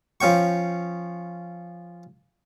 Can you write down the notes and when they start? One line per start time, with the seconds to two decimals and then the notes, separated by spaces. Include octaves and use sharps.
0.21 F3 C#4 G5 C#6